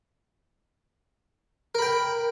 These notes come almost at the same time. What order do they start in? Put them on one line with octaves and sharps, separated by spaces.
A#4 B5 G5